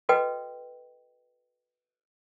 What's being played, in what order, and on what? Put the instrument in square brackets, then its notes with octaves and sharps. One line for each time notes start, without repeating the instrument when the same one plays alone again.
[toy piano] F#4 A4 B4 D#5 G5